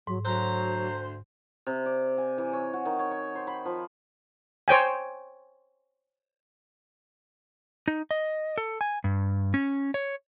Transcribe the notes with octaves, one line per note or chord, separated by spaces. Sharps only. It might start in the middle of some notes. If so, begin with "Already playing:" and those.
G#2 F#3
D2 F#3 C5 A#5 F#6
C3
D5
G#5
E3
C#5
F#4
D#3
C#5
C#5
C5
B5
F3
C5 C#5 G5 G#5
D#4
D#5
A4
G#5
G2
C#4
C#5